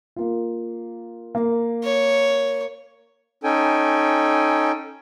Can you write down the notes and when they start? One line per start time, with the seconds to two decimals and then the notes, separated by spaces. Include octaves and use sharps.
0.16 A#3 F4
1.35 A#3
1.84 C#5
3.44 C#4 D#4 A4 G5 G#5